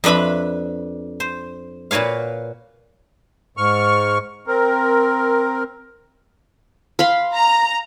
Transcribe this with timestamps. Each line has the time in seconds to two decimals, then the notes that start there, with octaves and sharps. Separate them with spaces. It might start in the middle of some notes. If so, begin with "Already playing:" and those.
0.04 F2 D4 B4 E5 B5
1.20 C5
1.91 A#2 F#4 B4 C#5 F5
3.57 G#2 C#6 F6
4.47 C4 A#4
6.99 F5 B5 C6
7.34 A#5